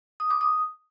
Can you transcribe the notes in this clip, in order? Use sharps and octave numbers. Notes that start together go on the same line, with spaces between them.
D#6
D6
D#6